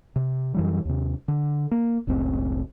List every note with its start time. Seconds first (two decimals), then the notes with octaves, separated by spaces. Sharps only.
0.16 C3
0.54 F#2 E3 G3
0.85 D#2 C3
1.28 D3
1.71 A#3
2.07 F#1 C#2 A2 C4